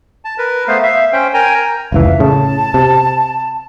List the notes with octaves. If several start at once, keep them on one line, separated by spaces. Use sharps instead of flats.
A5
A#4 B4
A3 B3 C5 F5
E5 F5
C#4 C5 G5
A#4 G5 G#5 A#5
F1 C#2 E3 E5 F5
A2 C#3 A5
C3